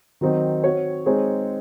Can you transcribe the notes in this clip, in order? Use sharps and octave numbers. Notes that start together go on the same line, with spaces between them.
D#3 F#3 C4 D#4
C4 F#4 C#5
G#3 C4 D#4 G#4 C#5